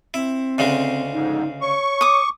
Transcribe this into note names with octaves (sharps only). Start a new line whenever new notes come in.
C4 E4
D2 C#3 G#3
F2 G#2 D#4
C#5 C#6
D6 D#6